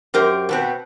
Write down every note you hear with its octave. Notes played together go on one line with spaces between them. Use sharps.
F#2 G4 A#4 C5
B2 B3 C4